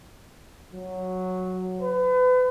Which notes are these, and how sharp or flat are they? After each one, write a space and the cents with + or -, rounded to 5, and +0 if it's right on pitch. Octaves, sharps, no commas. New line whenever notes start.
F#3 -5
B4 +35